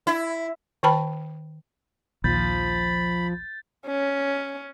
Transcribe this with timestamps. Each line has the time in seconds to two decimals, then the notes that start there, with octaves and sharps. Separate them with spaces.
0.07 E4
0.83 D#3 B4 G5 A5 B5
2.24 A#1 D#2 F3 B5 G6 A6
3.87 C#4